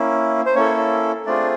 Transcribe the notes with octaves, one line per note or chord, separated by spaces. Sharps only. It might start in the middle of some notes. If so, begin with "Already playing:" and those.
Already playing: A#3 C#4 E4
C5
A#3 C#4 E4 A4 C#5
A3 C4 D4 F4 G#4 D5